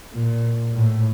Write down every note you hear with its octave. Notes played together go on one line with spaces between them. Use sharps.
A#2
A2